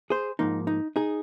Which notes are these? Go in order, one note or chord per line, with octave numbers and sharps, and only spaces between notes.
G#4 C5
G#2 F3 A#3 D#4
D#4
D#4 G#4